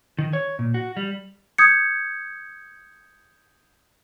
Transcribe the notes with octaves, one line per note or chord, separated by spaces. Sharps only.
D#3
C#5
A#2
F#4
G3
D#6 G6 G#6 C#7